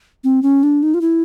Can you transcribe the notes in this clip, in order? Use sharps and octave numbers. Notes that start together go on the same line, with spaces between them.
C4
C#4
D4
D#4
F4
E4